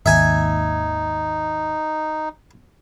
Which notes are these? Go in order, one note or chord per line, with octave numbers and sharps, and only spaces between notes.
G#1 D#2 D#4 E5 G#5